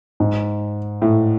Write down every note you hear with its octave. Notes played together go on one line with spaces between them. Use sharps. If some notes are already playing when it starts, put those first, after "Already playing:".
G#2
A2